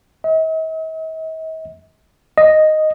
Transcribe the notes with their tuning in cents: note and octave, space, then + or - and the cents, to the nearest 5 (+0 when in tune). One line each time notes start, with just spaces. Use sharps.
D#5 +45
D#5 -5